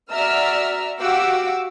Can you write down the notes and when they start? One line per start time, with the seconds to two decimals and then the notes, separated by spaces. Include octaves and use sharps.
0.12 F#4 D5 E5 A#5 E6 F6
0.98 F#4 G4 F5 F#5 D6 E6